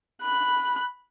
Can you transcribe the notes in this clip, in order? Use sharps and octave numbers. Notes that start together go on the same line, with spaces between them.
B5 F#6